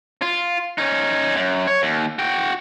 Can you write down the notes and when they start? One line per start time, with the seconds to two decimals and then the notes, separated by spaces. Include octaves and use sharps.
0.22 F4
0.78 C#4 D#4
1.36 F#2
1.67 C#5
1.82 D#2
2.19 F#4 G5